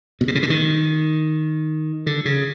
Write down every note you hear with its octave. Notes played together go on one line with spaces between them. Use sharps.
B2
C3
C#3
D3
D#3
D3
C#3